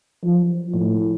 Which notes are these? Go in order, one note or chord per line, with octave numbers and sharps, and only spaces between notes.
F3
A2